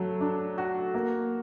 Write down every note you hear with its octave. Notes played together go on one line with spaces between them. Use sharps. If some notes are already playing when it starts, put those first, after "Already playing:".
Already playing: F#3 A3
D4
F#4
A#3